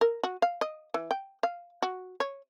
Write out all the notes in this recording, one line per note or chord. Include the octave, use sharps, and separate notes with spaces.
A#4
F#4
F5
D#5
E3
G5
F5
F#4
C#5